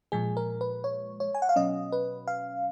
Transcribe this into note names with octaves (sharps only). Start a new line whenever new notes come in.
A#2 F3 G#3 G#4
A#4
B4
C#5
C#5
G#5
F#5
F5
B2 F#3 C#4 D#5
B4
F5